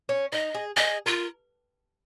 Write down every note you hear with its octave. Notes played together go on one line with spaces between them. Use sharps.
C#4
D#4 D#5
G#4
G#4 D#5
F4 A#4